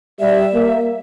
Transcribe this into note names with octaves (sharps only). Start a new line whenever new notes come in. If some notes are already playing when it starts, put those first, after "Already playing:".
G3 E5
A#3